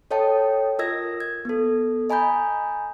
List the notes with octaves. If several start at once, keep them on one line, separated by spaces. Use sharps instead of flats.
A4 C#5 D#5 G5 A5
F4 A#4 D#5 E6 G#6 A#6
G#6
B3 A4
D#5 G#5 A#5 B5 G6